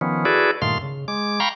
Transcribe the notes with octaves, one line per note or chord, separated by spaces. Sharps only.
D#3 F3 B3 C#4
E4 F#4 G#4 A4 B4 D5
G2 A#2 D#3 A3 F5 C6
C#3
G#3 D6
F5 G5 A#5 B5 C#6